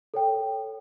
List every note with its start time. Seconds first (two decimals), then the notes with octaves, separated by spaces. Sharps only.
0.14 A4 C#5 G5